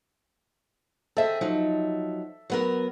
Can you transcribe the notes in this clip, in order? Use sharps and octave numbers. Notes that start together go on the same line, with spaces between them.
C4 G#4 A4 E5
F3 F#3 D#4
F#3 B3 A#4